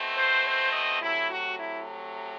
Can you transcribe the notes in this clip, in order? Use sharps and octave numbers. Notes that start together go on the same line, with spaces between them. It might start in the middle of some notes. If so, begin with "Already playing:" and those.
Already playing: B2 A3 C4
C5
C5
D#5
C3 F#3 A3 E4
F#4
E4